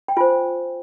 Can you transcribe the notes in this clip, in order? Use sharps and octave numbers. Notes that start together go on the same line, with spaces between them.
G5
F4 C5 G#5